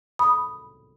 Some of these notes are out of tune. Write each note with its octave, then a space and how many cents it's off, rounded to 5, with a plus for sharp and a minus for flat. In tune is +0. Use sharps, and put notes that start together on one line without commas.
B5 +0 D#6 +0